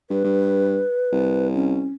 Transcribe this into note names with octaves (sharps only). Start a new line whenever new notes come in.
G2 B4
G2
C2
C#4